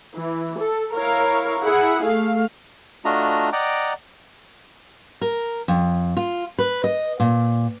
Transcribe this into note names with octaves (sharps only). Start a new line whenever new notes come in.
E3
A4
E4 A#4 C#5 F5
E4 G#4 F#5
A3 F5
A3 D4 F4 F#4 D#5 A#5
D5 D#5 F#5 G5 A#5 D6
A#4
F2
F4
B4
D#5
A#2